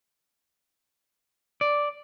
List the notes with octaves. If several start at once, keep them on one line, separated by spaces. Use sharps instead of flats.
D5